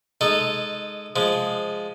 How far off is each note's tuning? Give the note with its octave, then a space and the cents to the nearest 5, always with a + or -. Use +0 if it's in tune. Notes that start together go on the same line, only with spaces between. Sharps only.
G#3 +5 D#4 -15 A4 +0
F3 +0 G#3 +0